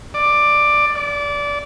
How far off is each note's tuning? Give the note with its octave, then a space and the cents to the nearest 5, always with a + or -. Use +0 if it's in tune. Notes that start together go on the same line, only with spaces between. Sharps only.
D5 +10
D5 -20